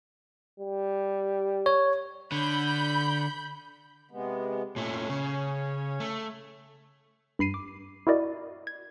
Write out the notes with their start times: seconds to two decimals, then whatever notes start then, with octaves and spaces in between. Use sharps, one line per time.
0.60 G3
1.66 C#5
2.32 D3 B5 G6
4.11 C3 G#3 B3
4.76 A#2 A3 C#4 C#5
5.10 C#3
6.00 A3
7.39 G2 B5 C7 D#7
7.54 D6
8.07 E4 F#4 A#4 D5 D#5
8.67 G#6